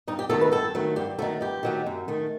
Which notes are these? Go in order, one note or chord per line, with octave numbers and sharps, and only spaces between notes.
G2 D#4
G4
D#3 F#3 A3 A4
B4
G2 A4
D#3 F#3 A3
G2 G4
D#3 F#3 A3 A4
G2 G4
D#3 F#3 A3
F#2
D#3 A3